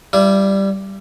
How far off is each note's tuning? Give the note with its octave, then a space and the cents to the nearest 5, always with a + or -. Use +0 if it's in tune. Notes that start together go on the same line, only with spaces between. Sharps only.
G3 +0 E4 +45